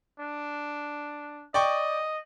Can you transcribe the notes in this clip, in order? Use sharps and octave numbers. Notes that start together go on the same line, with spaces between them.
D4
D5 D#5 G5 C#6